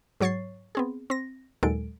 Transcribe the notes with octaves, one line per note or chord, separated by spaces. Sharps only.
G#2 F#3 C#5 C#6 A6 C7
B3 C4 G#4
C4 A#6
D#2 A#2 F#3 G#3 A4 D7